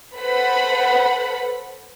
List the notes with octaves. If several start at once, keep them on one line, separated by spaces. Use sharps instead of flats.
A4 B4 C5 F#5 B5